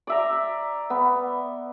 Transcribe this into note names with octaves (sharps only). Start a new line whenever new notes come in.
D5 E5 A#5
B3